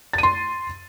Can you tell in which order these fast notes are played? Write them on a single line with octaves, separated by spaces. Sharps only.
A6 D#7 C6